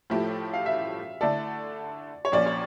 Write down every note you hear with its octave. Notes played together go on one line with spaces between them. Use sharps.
A2 F3 A3 E4 G4
F5
E5
D3 A3 E4 A4 D5
C#5
A#1 A#2 F3 C#4 D5
C#5